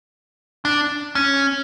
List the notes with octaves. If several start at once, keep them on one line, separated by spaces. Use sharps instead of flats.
D4
C#4